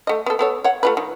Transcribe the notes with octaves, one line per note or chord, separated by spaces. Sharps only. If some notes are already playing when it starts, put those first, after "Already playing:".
A3 D#5
B3 A4
B3 A4 C#5
C#5 F#5
A3 F4 B4
D#3